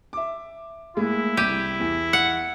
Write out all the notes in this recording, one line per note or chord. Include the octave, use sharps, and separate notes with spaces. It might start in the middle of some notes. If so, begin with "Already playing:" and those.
E5 D6
A2 G#3 A#3 E4
C2 G4 D#7
E2
F#5